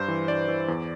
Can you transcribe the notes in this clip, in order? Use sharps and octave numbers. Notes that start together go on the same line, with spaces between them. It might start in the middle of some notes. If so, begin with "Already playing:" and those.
Already playing: G2 C5
E3
G2 D5
E3
E2